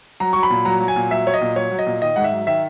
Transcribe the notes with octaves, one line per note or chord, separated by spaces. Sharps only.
F#3 A#5
F#3 C#6
B5
A#2
F#3 A#5
F#3
G#5
A#2
F#3 E5
F#3 C#5
D#5
A#2
F#3 C#5
F#3
D#5
A#2
D#3 D#5
G#2 F#5
E5
F#3
D#3 E5